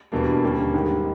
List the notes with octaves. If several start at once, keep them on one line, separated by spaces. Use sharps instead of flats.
E2 B2 G3 A#3 D4
D#2 D3 G3 A#3 C#4
G#2 D#3 G3 A#3